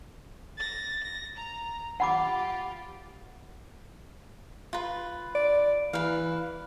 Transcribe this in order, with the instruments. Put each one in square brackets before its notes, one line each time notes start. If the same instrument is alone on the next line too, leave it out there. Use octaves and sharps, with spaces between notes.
[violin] A6 A#6
A#6
A#5
[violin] F4 G4 [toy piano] F#5 B5 D6
[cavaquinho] F4 B4
[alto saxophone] D5
[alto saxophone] E3 [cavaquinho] B4 F5